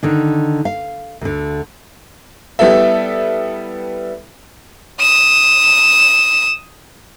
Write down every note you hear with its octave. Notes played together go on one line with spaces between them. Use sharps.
D3 D#3 D4
F5
D2 D3
G3 B3 E4 A4 E5
D#6 E7